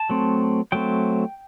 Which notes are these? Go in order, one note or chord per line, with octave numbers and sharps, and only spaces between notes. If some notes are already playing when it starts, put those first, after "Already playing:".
Already playing: A5
F#3 A3 C4
F#3 A3 C4 G5